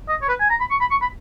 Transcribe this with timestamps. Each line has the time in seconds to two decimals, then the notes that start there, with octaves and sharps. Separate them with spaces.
0.09 D#5
0.22 C#5
0.29 B4
0.40 G#5
0.50 A#5
0.60 B5
0.71 C#6
0.81 B5
0.91 C#6
1.02 B5